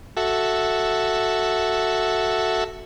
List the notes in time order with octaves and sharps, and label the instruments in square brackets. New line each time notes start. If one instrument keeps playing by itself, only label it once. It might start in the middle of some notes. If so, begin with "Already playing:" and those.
[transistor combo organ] F#4 A4 E5